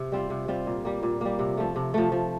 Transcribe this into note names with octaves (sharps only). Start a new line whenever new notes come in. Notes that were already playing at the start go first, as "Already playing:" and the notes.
Already playing: C3
G3 C4 F4
C3
G3 C4 F4
A#2
G3 A#3
A#2
G3 A#3
C3
F3 A3
C3
F3 A3
F3